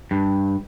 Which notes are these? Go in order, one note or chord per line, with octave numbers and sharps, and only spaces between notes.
G2